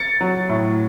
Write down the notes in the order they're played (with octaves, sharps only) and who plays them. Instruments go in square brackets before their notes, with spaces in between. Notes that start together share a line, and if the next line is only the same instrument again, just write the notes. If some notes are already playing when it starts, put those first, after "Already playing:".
Already playing: [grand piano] A6 C#7
F#3
A2